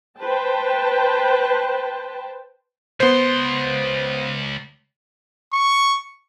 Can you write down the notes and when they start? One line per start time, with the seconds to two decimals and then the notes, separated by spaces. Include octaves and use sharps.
0.20 B4 C5 G5 A5
3.00 C#2 B3 C5 C6
5.53 C#6